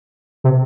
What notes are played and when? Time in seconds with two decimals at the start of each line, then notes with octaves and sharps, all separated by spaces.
0.44 C3